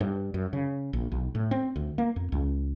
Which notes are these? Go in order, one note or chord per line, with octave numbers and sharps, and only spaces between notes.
G2
F#2
C#3
A#1
B1
A2
C4
D2
A#3
F2
C#2